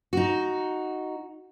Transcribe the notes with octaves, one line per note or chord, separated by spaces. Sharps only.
D#4 F#4